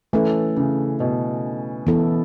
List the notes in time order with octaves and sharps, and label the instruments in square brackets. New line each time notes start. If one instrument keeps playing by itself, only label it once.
[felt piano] E3 [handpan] A3 C#4 A4
[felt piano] C#3
B2
[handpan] E3 B3 E4 A4